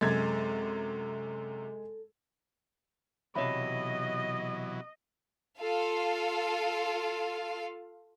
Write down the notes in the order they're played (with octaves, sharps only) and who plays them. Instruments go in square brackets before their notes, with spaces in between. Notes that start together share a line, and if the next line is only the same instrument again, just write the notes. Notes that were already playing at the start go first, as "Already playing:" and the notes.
[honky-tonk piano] F#2 C3 [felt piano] G#3 G#6 [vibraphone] A4
[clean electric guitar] B1 C3 [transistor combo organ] E3 F#3 [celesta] C#5 E5 B5 [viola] D#5
[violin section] F4 A4 F5